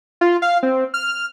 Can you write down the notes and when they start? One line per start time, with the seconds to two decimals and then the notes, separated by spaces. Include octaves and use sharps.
0.21 F4
0.42 F5
0.63 C4
0.94 F6